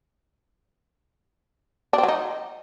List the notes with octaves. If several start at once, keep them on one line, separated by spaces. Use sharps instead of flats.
D4
C4
F#3
D#4